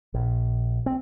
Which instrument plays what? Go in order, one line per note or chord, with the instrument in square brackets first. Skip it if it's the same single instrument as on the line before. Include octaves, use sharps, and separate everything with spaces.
[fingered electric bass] A#1
C4